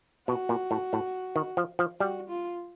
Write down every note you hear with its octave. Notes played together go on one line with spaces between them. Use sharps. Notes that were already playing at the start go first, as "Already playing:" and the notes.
B2 F#4
A#2
A2
A2
D#3
F3
F3
G3 F#4
F4